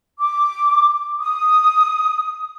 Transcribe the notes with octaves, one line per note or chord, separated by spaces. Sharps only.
D6
D#6